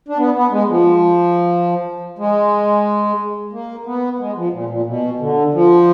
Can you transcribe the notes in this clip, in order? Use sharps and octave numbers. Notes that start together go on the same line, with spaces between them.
D4
B3
B3
G#3
F3
G#3
A#3
B3
G#3
F3
A#2
A#2
B2
D3
F3